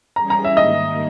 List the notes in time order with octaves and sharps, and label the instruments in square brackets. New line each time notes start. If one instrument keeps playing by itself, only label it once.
[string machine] E3 G3 C#4 G#4 [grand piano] A#5
[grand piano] A#5
E5
[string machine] G#2 D#3 G3 A#3 [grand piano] D#5